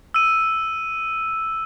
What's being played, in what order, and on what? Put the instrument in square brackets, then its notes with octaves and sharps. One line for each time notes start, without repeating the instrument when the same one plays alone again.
[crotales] E6 D#7